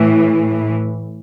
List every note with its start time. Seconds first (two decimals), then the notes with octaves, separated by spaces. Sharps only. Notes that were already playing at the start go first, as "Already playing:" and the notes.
Already playing: A2 E3